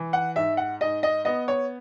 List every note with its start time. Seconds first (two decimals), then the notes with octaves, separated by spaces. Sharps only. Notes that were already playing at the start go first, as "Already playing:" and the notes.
Already playing: E3
0.13 F#5
0.36 G#2 E5
0.57 F#5
0.81 G#2 D#5
1.03 D#5
1.25 B3 D#5
1.48 C#5